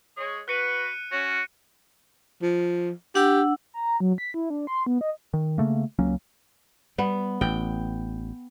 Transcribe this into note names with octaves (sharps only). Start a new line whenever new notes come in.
G#3 G#4 C#5
F#4 B4 F#6 C#7 D#7
C#4 F#4
F3
D4 G4 F#5 E6
A#5
F#3
B6
E4
D4
C6
B3
D#5
D#3
C#3 A3 A#3
C#2 F#3 A#3 C#4
G3 B3
A1 G5